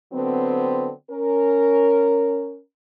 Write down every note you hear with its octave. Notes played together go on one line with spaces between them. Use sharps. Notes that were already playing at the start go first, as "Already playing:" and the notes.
D3 F#3 B3 C4
C#4 A#4